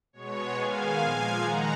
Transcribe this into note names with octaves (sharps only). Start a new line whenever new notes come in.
B2 G#3 B3 C#5
D#3 G#3 B3 F5 G#5
A#2 F3 G#3
D#3 G#3 D#4 F#5 A#5